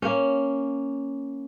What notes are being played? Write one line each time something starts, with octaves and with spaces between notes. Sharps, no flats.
A#3 C#4